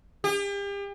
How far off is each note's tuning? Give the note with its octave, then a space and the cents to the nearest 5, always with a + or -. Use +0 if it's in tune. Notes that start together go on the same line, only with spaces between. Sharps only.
G4 +40